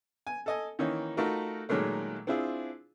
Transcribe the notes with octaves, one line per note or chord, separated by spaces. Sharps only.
G#5
A4 D#5 G#5
D#3 E3 A#3 C#4 D#4
A3 D#4 F4 F#4 A4 A#4
A#2 D#3 F#3 G#3 A3 A#4
C4 D4 E4 F4 G#4